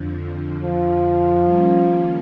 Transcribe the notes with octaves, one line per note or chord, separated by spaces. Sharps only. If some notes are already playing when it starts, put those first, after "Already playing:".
Already playing: F2 D3 F3
F3
D#3 G3 A#3 C#4